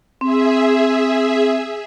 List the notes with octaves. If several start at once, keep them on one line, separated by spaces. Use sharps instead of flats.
C4 G#4 E5